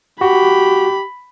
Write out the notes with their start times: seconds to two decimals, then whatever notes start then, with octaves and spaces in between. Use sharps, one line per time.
0.21 F#4 G4 B5